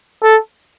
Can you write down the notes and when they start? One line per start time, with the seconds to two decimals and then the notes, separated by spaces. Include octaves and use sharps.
0.23 A4